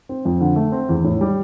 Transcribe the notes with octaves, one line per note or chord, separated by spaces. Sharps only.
C4
F2
D3
A3
C4
E2
A2
G3